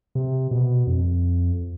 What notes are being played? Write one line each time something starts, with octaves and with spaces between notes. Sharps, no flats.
C3
B2
F2